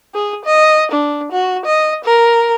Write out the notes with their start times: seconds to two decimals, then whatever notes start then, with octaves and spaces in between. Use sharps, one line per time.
0.14 G#4
0.45 D#5
0.92 D4
1.32 F#4
1.66 D#5
2.05 A#4